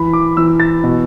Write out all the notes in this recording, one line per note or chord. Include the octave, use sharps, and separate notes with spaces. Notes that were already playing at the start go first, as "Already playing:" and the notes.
Already playing: E3 B5
D6
E3 E6
A6
B2